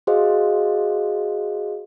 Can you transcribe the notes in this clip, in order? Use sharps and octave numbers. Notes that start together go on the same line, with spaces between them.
F#4 G#4 C5 D#5 F5